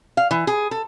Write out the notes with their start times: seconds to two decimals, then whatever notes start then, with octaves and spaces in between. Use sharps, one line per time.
0.17 F5
0.31 E3
0.47 G#4
0.71 A4